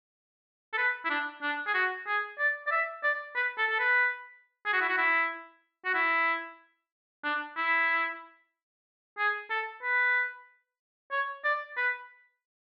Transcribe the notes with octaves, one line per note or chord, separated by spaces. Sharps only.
A4
B4
E4
D4
D4
G#4
F#4
G#4
D5
D5
E5
D5
B4
A4
A4
B4
G#4
F#4
E4
F#4
E4
F#4
E4
D4
E4
G#4
A4
B4
C#5
D5
B4